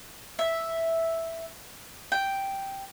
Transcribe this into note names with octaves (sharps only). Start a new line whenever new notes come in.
E5
G5